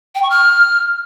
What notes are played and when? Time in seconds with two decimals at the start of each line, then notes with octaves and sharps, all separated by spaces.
0.15 G5
0.23 C#6
0.30 F6